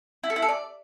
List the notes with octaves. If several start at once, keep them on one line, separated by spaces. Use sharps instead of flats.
E4
A4
E4
A4
D5